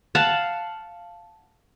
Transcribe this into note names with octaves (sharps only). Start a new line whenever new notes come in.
F5 F#5 A5